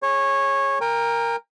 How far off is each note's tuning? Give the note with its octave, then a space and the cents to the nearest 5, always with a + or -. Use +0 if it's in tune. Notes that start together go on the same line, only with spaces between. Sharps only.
G#4 +0 C#5 -15
A#4 +0 G5 +40